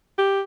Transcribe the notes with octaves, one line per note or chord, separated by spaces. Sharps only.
G4